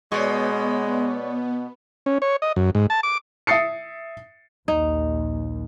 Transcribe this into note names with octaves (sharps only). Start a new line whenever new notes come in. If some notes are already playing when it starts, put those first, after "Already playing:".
B2 G#3 B3 C#5 D5 C#6
C#4
C#5
D#5
F#2
G#2
A5
D6
E5 D#6 A6 C7 C#7
A#1 D#2 D#4